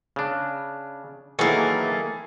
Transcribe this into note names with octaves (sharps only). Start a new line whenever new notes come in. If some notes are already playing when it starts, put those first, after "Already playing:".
C#3 D4
D#3 E3 F#3 A3 A#3 E4 G#4 G#5